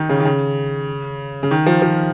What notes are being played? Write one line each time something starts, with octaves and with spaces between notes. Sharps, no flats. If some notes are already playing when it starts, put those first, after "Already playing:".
Already playing: D#3 D#4
C#3
D#3
C#3
C#3
D#3
F3
F3